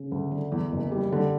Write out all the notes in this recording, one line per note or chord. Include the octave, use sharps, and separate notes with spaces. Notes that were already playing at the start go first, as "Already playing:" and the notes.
Already playing: C#3
D2
D3
E2
F#1
G3
D3